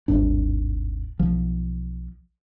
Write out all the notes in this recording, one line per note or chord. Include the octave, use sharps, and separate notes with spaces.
D#1 G#1 G2 D4
B1 F3